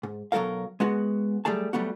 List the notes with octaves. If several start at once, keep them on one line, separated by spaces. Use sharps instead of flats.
G#2
B1 F#3 G3 A4 A#4 F5
G#3 B3 F#4
F#3 G3 A3 G#4 A5
F#3 G3 A3 B3 F#4